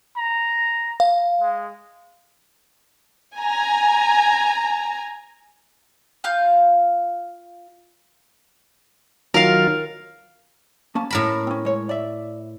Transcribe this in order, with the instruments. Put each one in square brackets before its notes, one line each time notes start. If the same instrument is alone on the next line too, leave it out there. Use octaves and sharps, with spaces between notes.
[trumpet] A#5
[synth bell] F5
[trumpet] G#3
[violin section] G#5 A#5
[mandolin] F4 F5 G6
[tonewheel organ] D#3 F#3 F4 [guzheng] A#4 F5
[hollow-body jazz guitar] A#3 C#4 A5
[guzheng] A2 A#4 B5
[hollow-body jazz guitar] C4 C#4
G#3 C#5
D5 E5